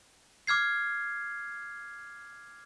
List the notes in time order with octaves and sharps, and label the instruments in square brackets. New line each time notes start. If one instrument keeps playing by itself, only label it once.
[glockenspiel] D6 F6 G#6 C7